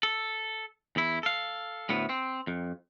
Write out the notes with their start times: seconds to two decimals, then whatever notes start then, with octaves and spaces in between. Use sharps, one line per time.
0.03 A4
0.96 E2 E4
1.23 A4 F5
1.89 D2 A2 B3
2.09 C4
2.47 F2